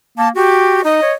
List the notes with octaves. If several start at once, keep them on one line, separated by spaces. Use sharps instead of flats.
A#3 A5
F#4 G4
D#4 D#5
C#5